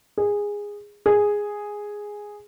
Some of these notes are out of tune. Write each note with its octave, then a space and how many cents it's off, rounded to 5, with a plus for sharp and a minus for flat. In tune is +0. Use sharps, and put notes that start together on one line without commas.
G#4 -15
G#4 -5